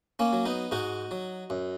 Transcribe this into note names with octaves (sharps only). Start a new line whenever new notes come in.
A#3 C#4
F#3
B3 D#4
G#2 D#4 F#4
F#3
F#2